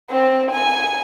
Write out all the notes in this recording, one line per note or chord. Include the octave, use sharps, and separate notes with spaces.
C4
G#5